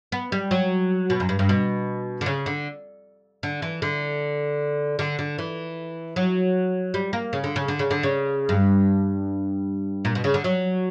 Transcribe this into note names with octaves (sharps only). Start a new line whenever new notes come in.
B3
G3
F#3
B2
F#2
G2
G2
B2
D3
C#3
D3
D3
E3
D3
D3
D3
E3
F#3
G3
A#3
C#3
D3
C#3
D3
C#3
D3
C#3
G2
A#2
B2
C#3
D3
F#3